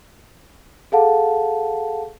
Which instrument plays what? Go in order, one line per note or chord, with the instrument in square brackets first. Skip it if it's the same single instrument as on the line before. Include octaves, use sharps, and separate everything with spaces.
[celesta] G#4 A4 F5 F#5 A5